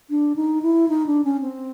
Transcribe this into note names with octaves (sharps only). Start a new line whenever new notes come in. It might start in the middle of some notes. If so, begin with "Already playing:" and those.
D4
D#4
E4
D#4
D4
C#4
C4